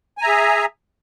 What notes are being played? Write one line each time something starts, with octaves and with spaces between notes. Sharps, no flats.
G#4 E5 G#5 A#5